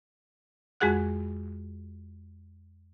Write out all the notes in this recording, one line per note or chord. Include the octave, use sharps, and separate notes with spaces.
F2 G#3 F#4 G#4 F#5 F#6